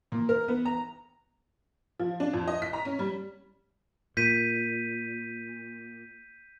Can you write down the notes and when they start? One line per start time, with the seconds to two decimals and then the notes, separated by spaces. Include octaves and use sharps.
0.12 A#2
0.29 A#4
0.48 B3
0.65 A#5
1.99 F3
2.20 D4
2.33 F2
2.48 D#5
2.62 B6
2.73 A#5
2.85 C#4
2.99 G3
4.17 A#2 G6 B6 D#7